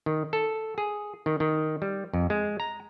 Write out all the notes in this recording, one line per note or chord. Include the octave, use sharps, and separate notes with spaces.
D#3
A4
G#4
D#3
D#3
G3
F2
G#3
A#5